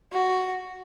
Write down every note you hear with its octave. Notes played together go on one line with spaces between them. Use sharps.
F#4